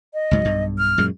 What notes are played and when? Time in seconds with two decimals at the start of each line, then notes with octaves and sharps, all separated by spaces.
0.14 D#5
0.31 C#2 G#2 F#3
0.45 B1 G2
0.78 F6
0.98 F#2 A#2 G#3